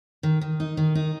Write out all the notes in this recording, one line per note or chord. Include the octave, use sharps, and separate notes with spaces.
D#3
D#3
D#4
D#3
D#4